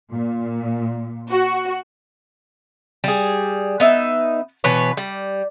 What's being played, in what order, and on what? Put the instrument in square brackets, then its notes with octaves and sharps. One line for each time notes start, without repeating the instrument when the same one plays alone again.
[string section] A#2
F#4
[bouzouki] G3 G#4
B3 D#4 E5
B2 E3 B4 C#5
G3